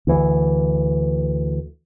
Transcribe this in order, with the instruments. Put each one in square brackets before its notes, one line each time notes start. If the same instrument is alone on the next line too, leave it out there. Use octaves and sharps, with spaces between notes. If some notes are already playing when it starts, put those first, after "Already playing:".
[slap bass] D2 E3